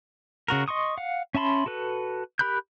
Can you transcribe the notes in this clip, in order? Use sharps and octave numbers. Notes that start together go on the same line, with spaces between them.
C#3 F#4 A#4
D#5 C6 C#6 D#6
F5 F#5
C#4 E5 A5 B5 C6
F#4 A4 B4
G4 A#4 B5 F#6 G6